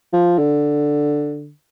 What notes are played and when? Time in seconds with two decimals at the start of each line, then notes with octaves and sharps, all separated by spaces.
0.13 F3
0.38 D3